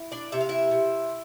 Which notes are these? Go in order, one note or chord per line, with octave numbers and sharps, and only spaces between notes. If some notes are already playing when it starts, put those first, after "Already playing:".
Already playing: E4
D4 D5
C3 E5
F5
E4 E5
C3